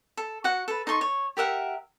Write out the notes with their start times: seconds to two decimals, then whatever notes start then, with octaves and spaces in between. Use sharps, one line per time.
0.17 A4
0.44 F#4 F#5
0.68 A4 B4
0.87 D#4 A4 C6 C#6
1.01 C#5
1.37 G4 A#4 E5 F#5